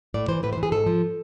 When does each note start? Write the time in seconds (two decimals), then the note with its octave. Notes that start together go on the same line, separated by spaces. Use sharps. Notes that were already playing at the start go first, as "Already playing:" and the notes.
0.14 A2 D5
0.28 E3 C5
0.43 A2 B4
0.53 C5
0.57 E3
0.63 G#4
0.72 G#2 A4
0.86 F3